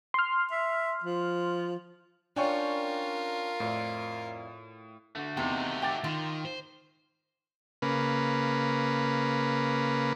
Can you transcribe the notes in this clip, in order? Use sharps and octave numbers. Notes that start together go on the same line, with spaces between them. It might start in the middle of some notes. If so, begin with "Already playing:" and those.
C6 F6
E5
F3
C#4 D4 F4 A#4 D5 G5 G#5 C#6
F2 A2 E4 D5
D3 A3 F#4
E2 C3 D#4 G4
G5 D6 A6
D#3 F4
C5
C#3 A#3 B4